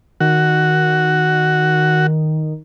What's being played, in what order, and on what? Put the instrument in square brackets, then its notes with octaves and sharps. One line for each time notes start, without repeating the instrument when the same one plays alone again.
[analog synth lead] D#3 [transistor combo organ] F#4